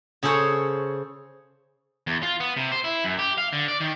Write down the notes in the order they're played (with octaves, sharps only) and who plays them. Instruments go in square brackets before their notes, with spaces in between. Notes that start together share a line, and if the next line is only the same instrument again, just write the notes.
[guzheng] C#3 G#4 A4 C5 C#5
[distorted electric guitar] E2
F4
B3
C3
C5
E4
F#2
G4
F5
D3
D5
D#3